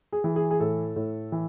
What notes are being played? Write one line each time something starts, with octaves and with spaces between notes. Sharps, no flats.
G#4
E3
G#4
G#4
A2 A4
A2
E3